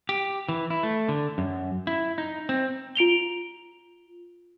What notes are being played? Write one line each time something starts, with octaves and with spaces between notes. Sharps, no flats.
G4
E3
E4
A3
D3
F#2
E4
D#4
C4
F4 D7 F7 G7